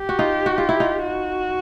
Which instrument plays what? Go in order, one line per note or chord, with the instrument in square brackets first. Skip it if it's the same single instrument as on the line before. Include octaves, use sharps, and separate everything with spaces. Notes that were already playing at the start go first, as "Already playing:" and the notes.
Already playing: [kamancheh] G4
[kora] F#4
D#4 F4
F#4
F4
E4
D#4 F4
[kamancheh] F#4